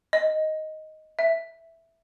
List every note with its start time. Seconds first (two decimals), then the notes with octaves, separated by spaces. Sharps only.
0.13 D#5
1.19 E5